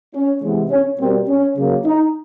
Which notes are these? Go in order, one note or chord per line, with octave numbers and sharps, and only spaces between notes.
C#4
C3 E3 G#3 B3
C#4
B2 G3 A#3 C4
C#4
C#3 F#3 A#3
D#4